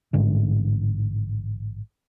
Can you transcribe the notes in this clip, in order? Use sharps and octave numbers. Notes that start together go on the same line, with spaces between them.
A1 G#2 D3